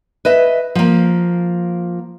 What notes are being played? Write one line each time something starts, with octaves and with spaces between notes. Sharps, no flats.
B4 D#5 E5
F3 A#3